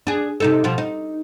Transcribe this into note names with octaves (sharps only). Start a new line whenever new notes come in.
D4 G#4
C3 D#4 A4
B2 F3
D#4